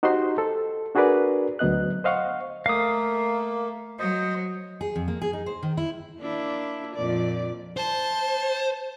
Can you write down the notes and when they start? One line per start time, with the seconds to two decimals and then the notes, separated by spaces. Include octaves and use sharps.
0.03 D#4 F#4 G4 C5 D#5 C6
0.38 A4
0.95 D4 F#4 G#4 A#4 B4 D5
1.59 D2 F#3 B3 D#5 F#6
2.04 C5 D#5 F5 F#5 C#6
2.66 A3 A#3 F5 D#6
3.99 F#3 C5 D#5
4.81 G#4
4.96 F2
5.08 A#3
5.22 G#4
5.33 D#4
5.46 C5
5.63 D#3
5.77 E4
6.19 A#3 D4 E4
6.95 F2 A#2 D5
7.77 C5 A5